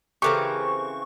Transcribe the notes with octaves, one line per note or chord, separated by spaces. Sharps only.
C#3 E3 C4 G4 A4 A#4 C#6